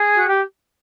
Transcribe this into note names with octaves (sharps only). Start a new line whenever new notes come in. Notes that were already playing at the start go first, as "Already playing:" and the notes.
Already playing: G#4
F#4
G4